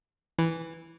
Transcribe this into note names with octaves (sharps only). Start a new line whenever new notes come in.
E3